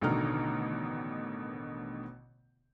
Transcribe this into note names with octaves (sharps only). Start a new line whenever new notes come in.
A1 B2 D3 D#3 A#5 F6